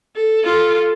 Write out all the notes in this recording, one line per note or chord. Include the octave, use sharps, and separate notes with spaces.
A4
F4 A4